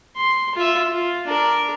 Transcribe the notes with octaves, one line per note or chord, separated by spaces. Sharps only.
C6
F4 E5
F4
D4 A#4